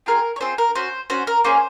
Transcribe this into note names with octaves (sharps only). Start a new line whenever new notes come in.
C4 F4 G#4 A#4
C#5
C4 F4 G#4 C5
A#4
C#4 F#4 C5
C#4 F#4 C5
A#4
A#3 C#4 G#4 C5